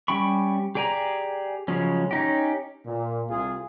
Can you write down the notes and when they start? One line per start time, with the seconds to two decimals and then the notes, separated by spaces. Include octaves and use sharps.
0.08 G3 C#4 G5 B5 C#6
0.75 G4 G#4 D5 G#5 A#5
1.68 C#3 F3 F#3 G#3 C#4
2.11 C#4 D#4 G4
2.86 A#2
3.29 C2 F4 G#4